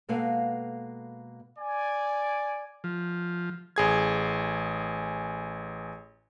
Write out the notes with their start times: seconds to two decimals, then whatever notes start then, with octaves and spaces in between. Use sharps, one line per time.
0.09 B2 G#3 A#3 A4 B4 F5
1.58 D5 G#5
2.84 F3
3.76 A1 G#4 G#6